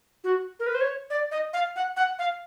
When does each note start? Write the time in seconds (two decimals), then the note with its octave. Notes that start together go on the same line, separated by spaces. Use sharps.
0.24 F#4
0.60 A#4
0.66 B4
0.75 C5
0.81 C#5
1.10 D5
1.31 D#5
1.53 F5
1.76 F#5
1.96 F#5
2.19 F5